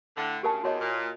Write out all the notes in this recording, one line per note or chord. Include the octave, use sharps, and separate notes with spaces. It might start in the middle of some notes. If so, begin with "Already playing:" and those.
A2 D3
D2 C#3 G4 A#4 A5
E2 F#4 C#5 D#5
A#2